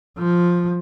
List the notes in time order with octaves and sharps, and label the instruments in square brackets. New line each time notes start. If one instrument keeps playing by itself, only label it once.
[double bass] F3